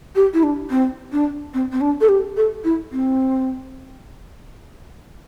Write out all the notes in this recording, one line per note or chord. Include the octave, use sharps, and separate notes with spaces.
G4
E4
D4
C4
D4
C4
C4
D4
A4
G4
A4
E4
C4